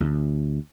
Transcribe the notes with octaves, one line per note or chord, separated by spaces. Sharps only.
D2